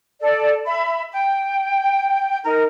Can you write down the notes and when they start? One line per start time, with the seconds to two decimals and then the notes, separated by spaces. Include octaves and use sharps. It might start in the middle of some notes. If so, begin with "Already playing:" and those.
0.21 A4 D5
0.66 E5 B5
1.11 G5
2.44 D#4 A#4